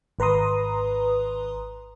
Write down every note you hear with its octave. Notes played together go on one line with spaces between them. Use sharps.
G#1 B4 A#5 C6 D#6